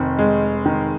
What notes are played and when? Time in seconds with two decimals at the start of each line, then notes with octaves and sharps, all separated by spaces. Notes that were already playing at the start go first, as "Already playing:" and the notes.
Already playing: F1 D#3
0.19 G#3
0.66 D#3